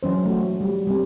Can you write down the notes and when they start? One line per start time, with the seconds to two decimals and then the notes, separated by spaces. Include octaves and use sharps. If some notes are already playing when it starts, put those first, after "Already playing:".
0.03 E3 F#3 C#4 C5
0.26 A3 F#4
0.61 G3
0.87 G3 C4